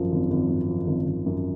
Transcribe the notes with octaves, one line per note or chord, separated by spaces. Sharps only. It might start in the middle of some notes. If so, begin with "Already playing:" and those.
Already playing: G#1 F#2 F3
G#1
G#1
F#2
F3
G#1
G#1
F#2